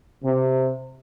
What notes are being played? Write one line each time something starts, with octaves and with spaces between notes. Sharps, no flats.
C3